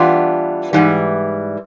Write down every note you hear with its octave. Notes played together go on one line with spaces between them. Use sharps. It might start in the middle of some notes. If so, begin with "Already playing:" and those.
Already playing: E3 G3 B3 D4 F4
G#2 E3 G3